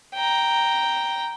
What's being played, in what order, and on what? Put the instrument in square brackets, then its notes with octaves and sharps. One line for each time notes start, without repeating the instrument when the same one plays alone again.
[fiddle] G5 A#5